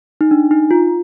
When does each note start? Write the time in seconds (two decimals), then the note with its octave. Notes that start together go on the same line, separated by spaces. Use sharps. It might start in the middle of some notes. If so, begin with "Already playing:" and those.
0.21 D#4
0.31 D4
0.51 D#4
0.71 F4